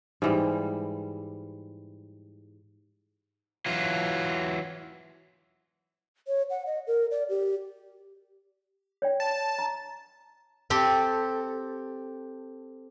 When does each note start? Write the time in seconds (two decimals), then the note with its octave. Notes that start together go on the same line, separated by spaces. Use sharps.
0.22 G#2 E3 G3
3.66 E3 F#3 F4
6.28 C#5
6.50 F#5
6.66 D#5
6.87 A#4
7.11 D5
7.29 G4
9.02 C#5 D5 G5
9.20 A5
9.59 A#5
10.70 C4 G4 A4